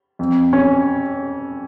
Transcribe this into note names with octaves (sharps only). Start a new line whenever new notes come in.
F2
C#4